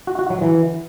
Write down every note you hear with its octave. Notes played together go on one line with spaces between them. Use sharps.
F#4
F#4
F#3
E3